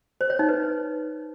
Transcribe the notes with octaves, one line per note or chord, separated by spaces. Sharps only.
C5
C#5
D#4
B4